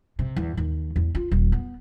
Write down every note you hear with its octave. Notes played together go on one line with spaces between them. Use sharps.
C3
E2
D#2
E2
F4
D#1
B3